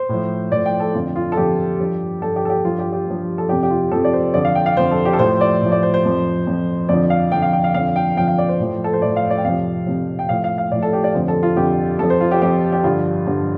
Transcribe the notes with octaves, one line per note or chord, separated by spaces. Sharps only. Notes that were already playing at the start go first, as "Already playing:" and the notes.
Already playing: C5
A2 F3
A2 F3 D5
G5
A4
F2 D3 F3 F4
F4
A4
F2 D3 F3 G4
G2 F3
G2 F3 A4
G4
A4
G4
G2 F3 F4
G4
G4
G2 F3
A4
F2 C3 F3 G4
G4
F4
F2 C3 F3 A4
D5
C5
F2 D3 F3 D5
F5
G5
F5
F2 D3 F3 C5
A4
G4
A4
A2 F3 C5
D5
A2 F3
D5
C5
C5
F2 F3
F2 F3
F2 D3 F3 D5
F5
F2 D3 F3 G5
F5
G5
F5
F2 D3 F3 F5
G5
F2 D3 F3 G5
F5
D5
C5
A2 F3
A4
C5
A2 F3 D5
F5
D5
G5
F2 C3 F3 F5
F2 C3 F3
G5
A2 F3 F5
F5
F5
A2 F3 D5
A4
G4
D5
F2 D3 F3 C5
A4
F4
F2 D3 F3 G4
F2 F3 A4
C5
F4
G4
F2 F3 G4
G4
G2 D3 F3 F4
G2 D3 F3